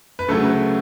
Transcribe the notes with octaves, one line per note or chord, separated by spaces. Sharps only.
B4
D2 C#3 F#3 A3 A4